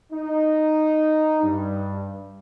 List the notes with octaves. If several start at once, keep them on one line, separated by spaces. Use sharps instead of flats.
D#4
G2